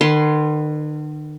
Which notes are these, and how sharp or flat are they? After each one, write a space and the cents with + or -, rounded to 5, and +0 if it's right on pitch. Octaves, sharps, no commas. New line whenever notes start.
D#3 -45 B4 +0 C6 +0